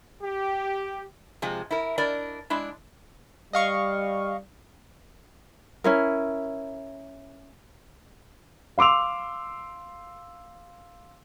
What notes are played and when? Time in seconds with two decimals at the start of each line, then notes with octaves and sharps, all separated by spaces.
0.21 G4
1.42 C3 F3 G#3
1.71 E4 A#4
1.98 D4 E4 A#4 D5 D#5
2.50 G#3 D4 E4
3.53 G3 D#5 F5 C#6
5.84 C#4 E4 A#4
8.78 F5 C6 D6 E6 F7